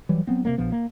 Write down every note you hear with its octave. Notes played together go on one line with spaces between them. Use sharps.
E3 F#3 G3
F#3 B3 C4
C3 G#3 A#3
A#1 F3 B3
A#3